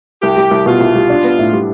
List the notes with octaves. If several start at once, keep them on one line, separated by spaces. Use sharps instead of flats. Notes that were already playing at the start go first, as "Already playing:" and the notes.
C2 G4
G3
C2
B2 F4
C2
G3
D4
B3
A2
G3